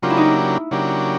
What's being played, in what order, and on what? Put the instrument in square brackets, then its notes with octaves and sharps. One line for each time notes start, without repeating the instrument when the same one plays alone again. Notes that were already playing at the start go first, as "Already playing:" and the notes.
[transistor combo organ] C#3 F#3 A#3 D4 G4 [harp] F4
[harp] E4
D#4
E4
[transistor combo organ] C#3 F#3 A#3 D4 G4